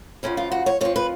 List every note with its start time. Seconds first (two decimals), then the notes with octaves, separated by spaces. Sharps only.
0.23 F#2 C#3 F3 C#4
0.37 F4
0.52 F#4
0.66 C#5
0.81 F2 F3 C#5
0.96 B4